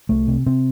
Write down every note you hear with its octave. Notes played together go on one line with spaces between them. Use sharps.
C2 A3
C3
C3 C4